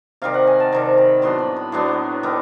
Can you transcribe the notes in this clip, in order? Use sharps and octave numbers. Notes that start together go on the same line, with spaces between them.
C3 D#3 G3 F5
F#5
G#5
A5
C3 D#3 G3 A#5
B5
A2 F#3 B3 D4 C6
B5
B5
A2 F#3 B3 D4 C6
D#3 G3 B3